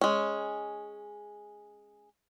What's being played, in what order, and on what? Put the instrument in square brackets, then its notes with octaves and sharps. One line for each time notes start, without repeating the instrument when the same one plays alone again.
[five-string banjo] G#3 C#4